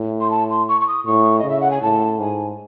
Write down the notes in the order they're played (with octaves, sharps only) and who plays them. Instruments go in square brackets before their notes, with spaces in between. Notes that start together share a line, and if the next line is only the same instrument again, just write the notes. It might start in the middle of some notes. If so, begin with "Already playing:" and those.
Already playing: [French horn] A2
[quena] C6
A5
C6
C#6
C#6
D#6
[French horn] A2 [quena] C#6
[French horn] C#3 [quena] D#5
[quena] E5
F#5
G#5
[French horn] A2 [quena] A5
[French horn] G#2 [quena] G#5